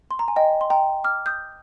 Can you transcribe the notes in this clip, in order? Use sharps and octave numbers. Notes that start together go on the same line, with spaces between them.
C6
A#5
G#5
D#5 G5
C6
G5 A#5
D6 F6
D#6 G6